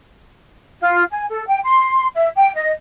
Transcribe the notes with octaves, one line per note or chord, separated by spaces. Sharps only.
F4
G#5
A4
G5
C6
E5
G5
D#5